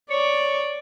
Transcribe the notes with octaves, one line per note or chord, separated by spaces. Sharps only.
C#5 D5